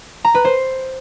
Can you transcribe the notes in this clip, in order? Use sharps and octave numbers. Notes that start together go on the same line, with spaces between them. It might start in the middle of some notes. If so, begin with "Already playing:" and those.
A#5
B4
C5